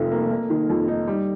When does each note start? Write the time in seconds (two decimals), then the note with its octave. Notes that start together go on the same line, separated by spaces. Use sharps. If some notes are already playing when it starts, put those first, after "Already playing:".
Already playing: F1 F2 D#3
0.12 A#3
0.31 A#3
0.50 D#3
0.69 F2
0.88 D#4
1.07 G3